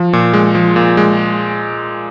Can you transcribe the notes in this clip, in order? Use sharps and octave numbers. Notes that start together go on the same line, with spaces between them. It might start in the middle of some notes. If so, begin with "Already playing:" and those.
Already playing: F3
A#2
G#3
F3
A#2
G#3